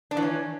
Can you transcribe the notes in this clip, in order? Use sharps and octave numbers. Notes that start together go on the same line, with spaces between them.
D4
E3
C#4